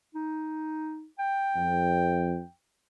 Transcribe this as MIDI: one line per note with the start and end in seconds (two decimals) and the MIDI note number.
0.15 1.06 63
1.19 2.52 79
1.56 2.41 41